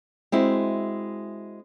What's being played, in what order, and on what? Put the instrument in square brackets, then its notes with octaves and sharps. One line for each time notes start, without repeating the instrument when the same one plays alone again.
[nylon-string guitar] G#3 C4 E4 F#4